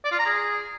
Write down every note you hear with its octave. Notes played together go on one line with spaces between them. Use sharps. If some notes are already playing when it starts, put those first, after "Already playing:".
D5
F4
A#5
G#4